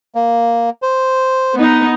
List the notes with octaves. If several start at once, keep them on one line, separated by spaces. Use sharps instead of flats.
A#3
C5
B3 D#4